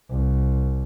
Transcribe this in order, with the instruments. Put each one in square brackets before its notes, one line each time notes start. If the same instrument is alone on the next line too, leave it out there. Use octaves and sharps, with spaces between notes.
[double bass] C2